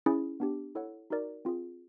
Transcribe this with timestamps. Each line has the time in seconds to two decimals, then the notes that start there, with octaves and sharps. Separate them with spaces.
0.06 C#4 E4 G#4
0.40 B3 D4 G4
0.75 E4 A4 C#5 F#5
1.10 D#4 F#4 A#4 D5
1.45 C4 F4 G#4